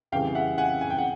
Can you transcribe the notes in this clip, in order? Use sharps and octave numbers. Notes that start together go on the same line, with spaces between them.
F2 C#3 E3 G3 F5 G5
E5 F#5
F#5 G#5
G#5
G5
F#5